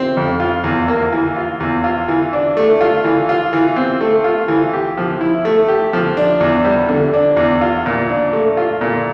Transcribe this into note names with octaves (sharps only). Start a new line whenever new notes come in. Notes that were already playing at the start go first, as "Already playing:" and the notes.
Already playing: C4
F2
F4
E2
A#3
E3
F4
E2
F4
E3
D4
A3
F4
E3
F4
E3
C4
A3
F4
E3
G4
F3
E4
A3
G4
F3
D4
E2
G3
D3
D4
E2
F4
A#2
D4
A3
F4
A#2